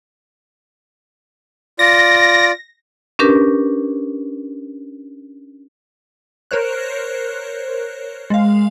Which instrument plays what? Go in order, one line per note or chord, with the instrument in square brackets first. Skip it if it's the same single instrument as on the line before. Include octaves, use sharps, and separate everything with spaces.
[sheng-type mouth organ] F4 D5 [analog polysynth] A#6
[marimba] C#4 D4 G4 A#4 B4
[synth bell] A#4 C5 C#5 F#6
G#3 F5